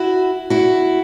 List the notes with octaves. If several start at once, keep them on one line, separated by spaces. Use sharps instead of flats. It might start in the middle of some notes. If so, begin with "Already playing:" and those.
Already playing: E4 F#4
E4 F#4